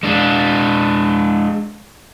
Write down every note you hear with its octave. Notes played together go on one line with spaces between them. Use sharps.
G#3 D4